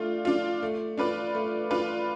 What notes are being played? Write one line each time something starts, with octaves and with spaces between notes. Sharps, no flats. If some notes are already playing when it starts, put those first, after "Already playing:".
Already playing: A3 D4 F4
D4 F4
A3
D4 F4 B4 D5
A3
D4 F4 B4 D5